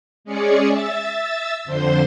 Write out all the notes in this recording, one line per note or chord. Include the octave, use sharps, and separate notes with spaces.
G#3 C#4 G#4 D5 C#7
E5 E6 A6
F2 D3 C5 C6